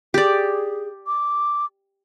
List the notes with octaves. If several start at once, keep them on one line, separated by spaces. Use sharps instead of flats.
G4 G#4 D5
D6